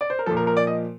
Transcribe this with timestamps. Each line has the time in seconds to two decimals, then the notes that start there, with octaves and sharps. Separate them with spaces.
0.01 D5
0.10 C5
0.19 A#4
0.26 A#2 F3 A4
0.37 A#4
0.47 A#4
0.57 D5
0.67 D#5